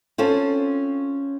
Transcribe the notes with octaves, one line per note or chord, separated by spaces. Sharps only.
C4 C#4 F4 A4